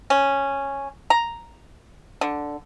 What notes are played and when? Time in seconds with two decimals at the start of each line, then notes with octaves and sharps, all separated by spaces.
0.10 C#4
1.10 A#5
2.21 D3